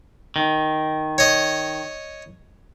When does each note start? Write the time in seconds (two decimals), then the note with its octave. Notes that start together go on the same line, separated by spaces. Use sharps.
0.36 D#3
1.18 C#5 D#5